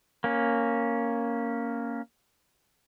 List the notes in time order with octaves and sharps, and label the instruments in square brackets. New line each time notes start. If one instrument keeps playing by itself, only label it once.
[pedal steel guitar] A#3 C#4